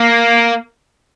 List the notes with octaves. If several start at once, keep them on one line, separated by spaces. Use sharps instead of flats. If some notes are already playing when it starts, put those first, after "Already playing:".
Already playing: A#3